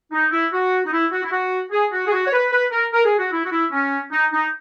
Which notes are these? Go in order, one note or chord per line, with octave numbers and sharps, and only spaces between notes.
D#4
E4
F#4
D#4
E4
F#4
E4
F#4
G#4
F#4
G#4
F#4
C#5
B4
B4
A#4
A#4
G#4
F#4
E4
F#4
E4
C#4
D#4
D#4